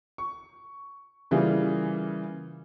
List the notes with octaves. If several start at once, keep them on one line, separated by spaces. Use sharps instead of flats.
C#6
C#3 E3 G3 A#3 F4 G#4